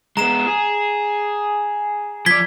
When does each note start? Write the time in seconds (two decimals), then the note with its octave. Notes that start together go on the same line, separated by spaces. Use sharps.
0.17 G#3 B3 A#5 E7
0.47 G#4
2.26 F3 D5 G#6 B6 G7